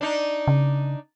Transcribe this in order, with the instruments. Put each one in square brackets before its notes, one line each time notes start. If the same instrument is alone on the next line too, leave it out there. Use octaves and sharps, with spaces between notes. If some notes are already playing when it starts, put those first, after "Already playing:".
[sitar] D4 D#4
[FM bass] C#3